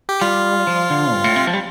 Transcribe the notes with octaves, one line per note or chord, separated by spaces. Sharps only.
G4
G3 F4
F3
D3
G2
A2
C3
F3
G3